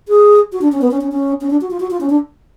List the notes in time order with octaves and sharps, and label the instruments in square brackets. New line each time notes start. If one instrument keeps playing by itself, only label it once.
[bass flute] G#4
F#4
D4
C#4
B3
C#4
C#4
C#4
C#4
D4
F#4
F4
F#4
F4
C#4
D4